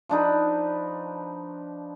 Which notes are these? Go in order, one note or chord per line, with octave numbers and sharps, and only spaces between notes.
F3 D4 D#4 B4